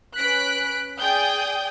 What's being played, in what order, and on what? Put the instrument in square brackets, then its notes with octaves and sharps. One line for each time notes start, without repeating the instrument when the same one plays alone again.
[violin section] C#4 B4 F#6 B6 D7
G#4 D5 G5 D#6 G6